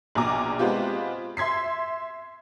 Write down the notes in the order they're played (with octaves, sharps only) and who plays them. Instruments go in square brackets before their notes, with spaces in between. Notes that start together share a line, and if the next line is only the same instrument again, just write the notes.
[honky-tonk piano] A#1 B2 G#5 A#5 D6
G#3 B3 C4 F4 G4
E5 C6 G#6 B6 C7